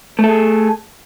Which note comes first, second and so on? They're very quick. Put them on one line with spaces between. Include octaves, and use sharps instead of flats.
A3 A4 G#4